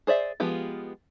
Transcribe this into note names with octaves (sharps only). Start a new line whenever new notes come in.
G#4 C5 D5 E5
F3 G#3 B3 F4 G4